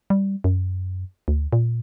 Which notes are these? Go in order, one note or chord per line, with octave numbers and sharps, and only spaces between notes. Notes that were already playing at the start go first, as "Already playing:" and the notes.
G3
F#2
D2
A#2